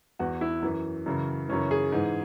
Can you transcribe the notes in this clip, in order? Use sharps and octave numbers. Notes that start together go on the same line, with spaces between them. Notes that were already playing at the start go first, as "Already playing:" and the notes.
E2 E3 F#4
E4
F#2 E3
F#2 C#3 E3
F#2 C#3 E3 C#4
G#4
G#2 E3